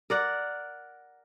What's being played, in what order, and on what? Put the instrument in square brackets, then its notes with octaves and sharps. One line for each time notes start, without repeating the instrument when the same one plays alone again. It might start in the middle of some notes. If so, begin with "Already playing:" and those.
[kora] A#4 D5 F#5